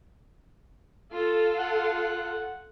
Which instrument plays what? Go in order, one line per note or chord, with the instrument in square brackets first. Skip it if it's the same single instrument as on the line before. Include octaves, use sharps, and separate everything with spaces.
[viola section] F4 A4
[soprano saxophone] F#5